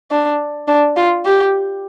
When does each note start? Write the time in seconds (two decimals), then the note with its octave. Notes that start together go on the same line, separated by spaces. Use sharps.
0.11 D4
0.68 D4
0.96 F4
1.25 G4